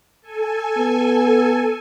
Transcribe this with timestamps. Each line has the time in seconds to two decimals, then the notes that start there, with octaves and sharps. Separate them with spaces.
0.21 A4 G#5
0.77 B3